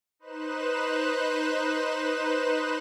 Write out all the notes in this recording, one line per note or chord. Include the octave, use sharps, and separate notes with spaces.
D#4 B4 C5 F#6 E7